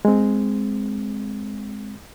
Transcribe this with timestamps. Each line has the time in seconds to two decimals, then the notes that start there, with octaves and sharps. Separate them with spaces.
0.05 G#3 C4